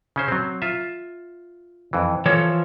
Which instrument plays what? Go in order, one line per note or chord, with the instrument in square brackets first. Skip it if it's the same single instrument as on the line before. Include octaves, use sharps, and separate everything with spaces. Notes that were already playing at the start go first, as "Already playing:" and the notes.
[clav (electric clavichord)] C#3 C#4 C5
F#3 C4
F4 E5
F2 E3
[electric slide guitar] E3 F3 C#5 [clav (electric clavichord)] A4